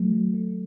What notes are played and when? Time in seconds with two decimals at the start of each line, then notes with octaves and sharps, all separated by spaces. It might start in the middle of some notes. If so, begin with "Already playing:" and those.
Already playing: D#3 F#3 A3
0.12 F#3
0.34 A3